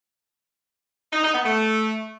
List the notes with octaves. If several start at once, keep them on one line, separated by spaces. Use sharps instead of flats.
D#4
D#4
B3
A3